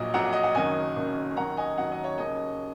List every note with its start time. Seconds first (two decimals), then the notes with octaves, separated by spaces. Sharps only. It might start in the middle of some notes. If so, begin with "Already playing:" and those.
Already playing: A#1 A#2 F#3 D#5
0.14 A#1 A#2 F#3 F#5 A#5
0.33 D#5
0.43 F#5
0.55 F#1 F#2 D#3 F#3 D#5 G#5
0.96 F#1 F#2 D#3 F#3
1.37 D#2 D#3 F#3 F#5 A#5
1.57 D#5 G#5
1.78 D#2 D#3 F#3 F#5
1.92 D#5
2.04 C#5
2.18 D#2 C#3 F#3 D#5